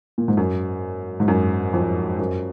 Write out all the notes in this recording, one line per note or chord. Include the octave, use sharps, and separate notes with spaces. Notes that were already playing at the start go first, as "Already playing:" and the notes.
A#2
G#2
F#2
G#2
F#2
F2
F#2